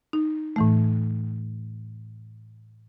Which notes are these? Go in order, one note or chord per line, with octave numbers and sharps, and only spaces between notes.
D#4
A2 E3 A3